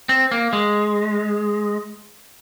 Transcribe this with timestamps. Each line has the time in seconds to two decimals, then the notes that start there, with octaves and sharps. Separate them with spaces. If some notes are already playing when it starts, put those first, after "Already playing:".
0.09 C4
0.31 A#3
0.53 G#3